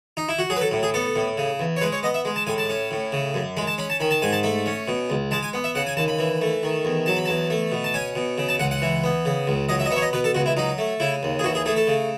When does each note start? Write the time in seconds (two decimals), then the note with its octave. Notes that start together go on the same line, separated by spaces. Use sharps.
0.17 D#4
0.29 E4
0.39 F#4
0.50 F#3 G#4
0.57 B4
0.61 A4
0.71 A2
0.83 G#4
0.94 B3 A4
1.16 A2
1.38 C#3
1.60 E2
1.77 C#5
1.81 G#3 B4
1.92 C#5
2.03 B3 D#5
2.14 E5
2.25 G#3
2.36 A5
2.47 A2 G#5
2.58 A5
2.69 C#4
2.91 A2
3.12 C#3
3.34 F#2
3.57 G#3 B5
3.67 A5
3.78 C#4 B5
3.90 A5
4.00 D#3 B5
4.11 A5
4.22 G#2 G#5
4.33 A5
4.43 A3 B5
4.66 C#4
4.88 B2
5.10 C#2
5.31 G#3 A5
5.43 G#5
5.53 B3
5.64 E5
5.75 C#3 F#5
5.87 G#5
5.97 D#2 A5
6.08 B5
6.19 E3
6.41 A3
6.63 D#3
6.85 E2
7.06 F#3 A5
7.17 B5
7.25 E2 A5
7.50 A3
7.72 B2
7.84 A5
7.94 C#4 G#5
8.16 B2
8.38 C#3
8.49 A5
8.60 C#2 F#5
8.71 F#5
8.82 E3
9.04 B3
9.25 C#3
9.47 C#2
9.69 F#3 D#5
9.80 E5
9.86 D#5
9.91 B3 E5
9.96 C#5
10.02 D#5
10.13 B2 B4
10.24 A4
10.35 C#2 F#4
10.46 E4
10.57 F#3 D#4
10.78 A3
11.00 C#3 E4
11.23 D#2
11.39 G#4
11.44 E3 F#4
11.55 G#4
11.66 A3 G#4
11.76 A4
11.87 C#3